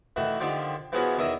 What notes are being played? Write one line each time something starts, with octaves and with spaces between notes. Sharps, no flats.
D#3 E3 A3 F#4
D3 D#3 F3 F4 G4
E3 F3 G#3 B3 C#4 F#4
E2 D#3 A#4 E5 D#6